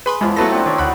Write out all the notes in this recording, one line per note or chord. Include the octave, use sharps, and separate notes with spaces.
G#4 B4 B5 C6
E2 F3 G#3 E4 F4
F#3 A3 B3 A4 B4 A5 A#5 A#6
C4 D4
D#3 C#5 D5 E5
D2 F#5 B5